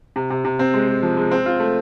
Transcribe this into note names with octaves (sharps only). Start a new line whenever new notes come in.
C3
C3
C3
C4
G#3
G#3
F3
G#3
C4
F4
A3